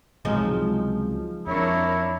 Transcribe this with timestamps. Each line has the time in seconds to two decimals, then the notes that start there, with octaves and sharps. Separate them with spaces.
0.25 C#2 C3 F3 F#3 G#3 D#4
1.47 F2 D4 E4 A#4 C#5